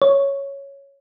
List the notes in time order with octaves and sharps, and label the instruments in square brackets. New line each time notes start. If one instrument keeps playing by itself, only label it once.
[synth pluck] C#5